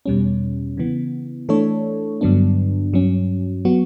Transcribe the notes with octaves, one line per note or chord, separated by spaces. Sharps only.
E2 B2 G3 C#4
C#3 E3 B3
E3 A3 D4 A4 C#5
G2 D3 F#3 B3 D4
G2 F#3 C#4
F#3 B3 F#4